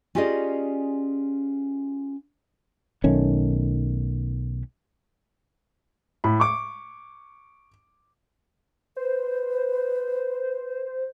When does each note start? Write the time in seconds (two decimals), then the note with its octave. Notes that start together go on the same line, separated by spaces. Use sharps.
0.15 C#4 F4 G4 G#4 D5 D#5
3.04 B1 D#3 A3 C#4
6.24 A2 B5
6.40 C#6 D6
8.97 B4 C5